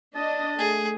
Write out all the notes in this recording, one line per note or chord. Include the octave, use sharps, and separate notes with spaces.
D4 D#5 A5
A3 G#4